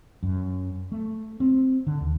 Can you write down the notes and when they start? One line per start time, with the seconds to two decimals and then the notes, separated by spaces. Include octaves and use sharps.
0.23 F#2
0.92 A3
1.40 C4
1.87 D3
2.01 D#2